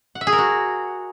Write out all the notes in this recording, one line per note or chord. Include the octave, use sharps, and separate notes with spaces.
F#5
E5
G#4
A#4
F#4